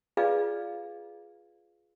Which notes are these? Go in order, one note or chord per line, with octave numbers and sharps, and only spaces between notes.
F4 G#4 B4 D5 D#5 F5